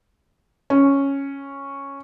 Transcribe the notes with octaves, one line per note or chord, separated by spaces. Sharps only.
C#4